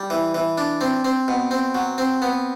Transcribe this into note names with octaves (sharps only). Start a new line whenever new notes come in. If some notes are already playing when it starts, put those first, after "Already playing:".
Already playing: G3
E3
E3
D4
C4
C4
B2
C4
F#3
C4
B3